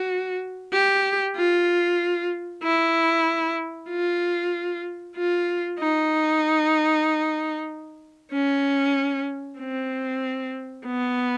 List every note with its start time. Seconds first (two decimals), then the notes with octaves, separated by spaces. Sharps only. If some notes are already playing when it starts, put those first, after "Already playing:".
Already playing: F#4
0.73 G4
1.36 F4
2.63 E4
3.90 F4
5.17 F4
5.79 D#4
8.32 C#4
9.59 C4
10.86 B3